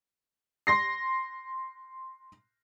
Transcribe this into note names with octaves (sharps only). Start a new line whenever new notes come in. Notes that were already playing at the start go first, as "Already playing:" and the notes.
C6 A#6 C7